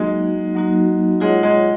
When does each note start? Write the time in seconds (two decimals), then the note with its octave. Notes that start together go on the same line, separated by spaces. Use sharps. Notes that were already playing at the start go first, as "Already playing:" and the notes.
Already playing: F#3 G#3 A#3 D#4 F#4
0.55 F#3 A#3 D#4 F#4
1.20 G#3 F4 G#4 C#5 F#5
1.43 G#3